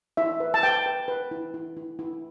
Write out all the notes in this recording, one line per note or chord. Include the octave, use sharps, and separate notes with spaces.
E4 E5
B4
A5
B4 G5
B4
B4
E4
E4
E4
E4